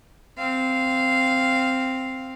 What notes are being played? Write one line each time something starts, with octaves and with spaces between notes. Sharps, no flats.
C4 F5